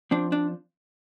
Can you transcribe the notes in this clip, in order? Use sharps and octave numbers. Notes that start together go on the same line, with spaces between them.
F3 C4 D4
D4